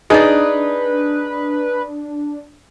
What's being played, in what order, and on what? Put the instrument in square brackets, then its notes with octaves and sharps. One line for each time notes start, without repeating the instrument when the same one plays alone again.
[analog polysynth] D4 [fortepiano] D#4 [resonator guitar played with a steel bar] G#4 D5 [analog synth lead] B4